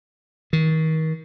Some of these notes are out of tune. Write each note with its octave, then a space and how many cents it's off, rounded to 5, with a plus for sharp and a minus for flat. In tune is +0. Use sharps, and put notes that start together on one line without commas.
D#3 +35